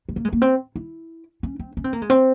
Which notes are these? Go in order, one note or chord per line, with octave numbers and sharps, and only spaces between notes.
G#3
A#3
G#3
A#3
C4
E4
C#4
C4
C#4
C4
A#3
G#3
C4